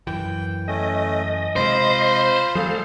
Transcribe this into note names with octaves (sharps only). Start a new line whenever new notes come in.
F#2 E3 G5
A3 C#4 D#5
C3 G#3 F4 C5 B5 C6
F3 G3 A3 G#4 A4 C5 F5